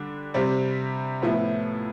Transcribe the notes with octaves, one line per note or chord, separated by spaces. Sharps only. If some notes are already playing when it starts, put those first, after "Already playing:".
Already playing: D3 G3 D4
C3 G3 C4 G4 C5
A2 F3 B3 E4